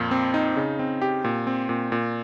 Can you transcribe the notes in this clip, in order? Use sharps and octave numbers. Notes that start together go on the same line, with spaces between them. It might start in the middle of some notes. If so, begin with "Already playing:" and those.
Already playing: F2 A#2
C4
D#4
C#3
C4
G4
A#2
C4
A#2
A#2